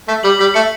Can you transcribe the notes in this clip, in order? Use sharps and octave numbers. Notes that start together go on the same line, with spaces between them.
A3 B6
G3 F#7
G3 B6
A3 C#7